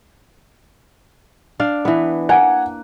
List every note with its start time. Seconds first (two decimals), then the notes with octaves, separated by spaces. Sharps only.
1.60 D4 D5 F5
1.85 E3 B3
2.29 A#3 F#5 G#5